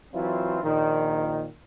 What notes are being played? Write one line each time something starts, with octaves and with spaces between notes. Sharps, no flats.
E3 F#3 C4 E4 F4
A#1 A#2 D#3